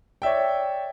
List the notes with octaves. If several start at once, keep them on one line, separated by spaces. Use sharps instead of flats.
C#5 D5 E5 G5